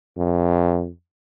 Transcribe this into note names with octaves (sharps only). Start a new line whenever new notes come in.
F2